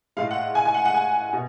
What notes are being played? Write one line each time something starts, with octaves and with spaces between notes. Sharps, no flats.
A2 G#3 F5
F#5
G#5
G#5
F#5
F#5
G#5
B2